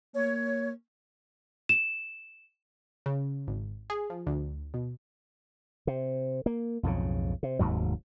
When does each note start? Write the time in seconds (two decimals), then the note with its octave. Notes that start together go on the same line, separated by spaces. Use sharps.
0.15 A#3 C#5
1.69 E7
3.06 C#3
3.48 G#1
3.90 G#4
4.10 F3
4.27 D2
4.74 B2
5.87 C3
6.46 A#3
6.83 B1 F2 G#2 C#3
7.43 C3
7.59 F1 D#2 G#2 F#3